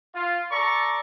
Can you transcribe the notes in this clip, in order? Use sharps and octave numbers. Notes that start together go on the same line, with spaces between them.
F4
A4 D5 A#5 C#6